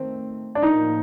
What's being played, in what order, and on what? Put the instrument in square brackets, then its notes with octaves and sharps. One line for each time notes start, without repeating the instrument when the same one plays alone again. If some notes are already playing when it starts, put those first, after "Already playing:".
Already playing: [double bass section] D#3 A3 C4
[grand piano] D4
[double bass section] A2 F3 A#3 [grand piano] D#4